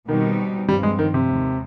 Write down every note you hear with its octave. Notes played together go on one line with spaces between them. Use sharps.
B2 D#3 G3 C4 D#4
G2 F3 G3 C4
G#3
D#3
C3
D#2 D#3 G#3